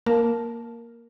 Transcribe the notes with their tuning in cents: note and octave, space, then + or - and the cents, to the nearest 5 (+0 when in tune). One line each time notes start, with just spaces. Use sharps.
A#3 +0 A#4 +0 A5 -5